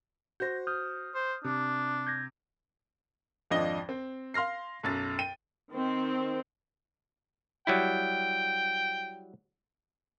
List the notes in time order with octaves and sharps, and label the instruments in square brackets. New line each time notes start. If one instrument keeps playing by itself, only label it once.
[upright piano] F#4 C5 [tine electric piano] G6 A#6
[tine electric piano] D#6 F6 G6
[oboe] C5
[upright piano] C3 [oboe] D4
[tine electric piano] G6 G#6 A#6
[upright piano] G#1 F2 F3 D4 D#5 G7
C4
F5 C6 F6 A#6 C7
B1 F#2 A6
G5 D#7
[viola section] D#3 C4
[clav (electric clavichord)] F#3 G3 E4 [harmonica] G5